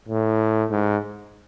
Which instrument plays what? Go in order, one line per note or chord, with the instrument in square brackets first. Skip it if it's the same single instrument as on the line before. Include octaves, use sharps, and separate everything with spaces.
[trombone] A2
G#2